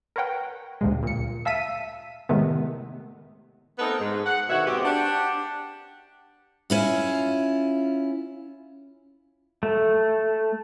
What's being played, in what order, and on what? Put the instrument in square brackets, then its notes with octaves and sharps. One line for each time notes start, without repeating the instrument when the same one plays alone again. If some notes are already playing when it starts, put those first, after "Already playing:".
[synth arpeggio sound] A#4 B4 C#5 F#5 G5
D2 G2 A#2 G#3
A#2 C#7
E5 F5 A5 E6 B6 D#7
A2 C3 D#3 G#3 A3 B3
[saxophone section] A3 B3 C4 D#4 A#4 B4
G#2
F#5
D2 B2 D#3 F#4 C#5 E5
G#3 B3 C4 F#4 G4
D4 G4 F#5
[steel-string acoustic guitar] C#4 E4 F4
[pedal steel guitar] A3